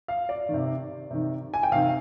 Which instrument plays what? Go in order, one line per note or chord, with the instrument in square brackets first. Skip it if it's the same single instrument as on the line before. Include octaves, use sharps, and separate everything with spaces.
[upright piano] F5
D5
D#3
C3
C3 D#3
G#5
G5
C3 D#3 F5